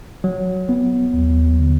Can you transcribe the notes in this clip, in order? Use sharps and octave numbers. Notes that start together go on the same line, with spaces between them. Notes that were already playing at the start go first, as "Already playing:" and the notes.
F#3
B3
D#2
D3